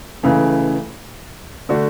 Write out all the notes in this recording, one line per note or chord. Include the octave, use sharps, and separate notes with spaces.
C#2 C#3 E3 A3
D3 A3 D4 F#4